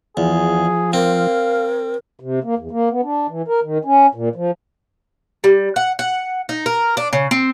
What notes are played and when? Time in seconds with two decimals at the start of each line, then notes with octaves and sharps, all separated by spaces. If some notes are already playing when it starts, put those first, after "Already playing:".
0.17 E2 F3 G#4
0.93 C4 A#4 F5
2.20 C3
2.44 A#3
2.58 E2
2.71 A#3
2.90 B3
3.03 D4
3.29 E3
3.48 A#4
3.63 D#3
3.85 C#4
4.15 A#2
4.36 F3
5.44 G3
5.76 F#5
5.99 F#5
6.49 D#4
6.66 A#4
6.97 D4
7.13 C#3
7.31 C4